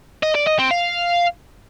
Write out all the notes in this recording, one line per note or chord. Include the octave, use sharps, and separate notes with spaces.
D#5
D5
D#5
C4
F5